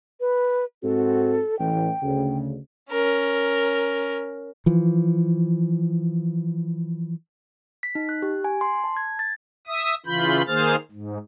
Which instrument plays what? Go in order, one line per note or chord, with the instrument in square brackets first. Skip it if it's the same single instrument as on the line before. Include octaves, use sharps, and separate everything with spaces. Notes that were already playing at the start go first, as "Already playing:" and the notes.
[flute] B4
[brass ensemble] G#2 C4 F#4 [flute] A4
[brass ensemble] A1 [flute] G5
[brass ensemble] D2 C#3
[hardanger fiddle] C#4 A#4
[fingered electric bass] E3 F3
[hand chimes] B6
D#4
F#6
G4
G#5
C6
A5
G#6
A6
[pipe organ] E5 D#6
C#3 E3 F4 B5 G6
D#3 A#3 G#4 C5 F6 A6
G#2